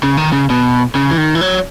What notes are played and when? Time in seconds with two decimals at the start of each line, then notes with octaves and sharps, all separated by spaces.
0.03 C#3
0.17 D#3
0.32 C#3
0.50 B2
0.95 C#3
1.11 E3
1.18 D#3
1.35 E3
1.41 F#3